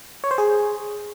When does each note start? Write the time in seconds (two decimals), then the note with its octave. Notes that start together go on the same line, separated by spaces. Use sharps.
0.24 C#5
0.31 C5
0.38 G#4